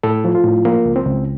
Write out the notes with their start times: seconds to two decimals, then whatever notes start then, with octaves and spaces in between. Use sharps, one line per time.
0.03 A2 A4
0.24 F3
0.35 F4
0.44 A2
0.65 F3 A#3
0.85 C#2
0.96 C4
1.06 C#2